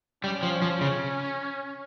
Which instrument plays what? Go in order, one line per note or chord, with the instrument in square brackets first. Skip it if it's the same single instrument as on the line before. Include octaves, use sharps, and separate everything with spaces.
[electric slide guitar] G3 [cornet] C#4
[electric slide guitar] F3
F3
C#3